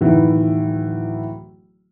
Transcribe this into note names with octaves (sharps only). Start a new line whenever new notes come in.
D1 D#3 E3 B3 E4